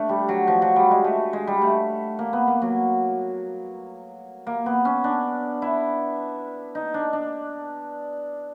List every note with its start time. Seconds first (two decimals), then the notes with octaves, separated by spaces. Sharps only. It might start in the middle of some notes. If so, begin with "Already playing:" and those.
Already playing: A3 D4
0.09 G3
0.28 F#3
0.47 F3
0.62 F#3
0.76 G3
0.91 G#3
1.04 A3
1.33 G#3
1.47 G3
1.61 A3
2.19 A#3
2.33 B3
2.48 A#3
2.62 F#3
4.47 A#3
4.66 B3
4.85 C#4
5.04 D4
5.62 E4
6.75 D#4
6.94 D4
7.13 D4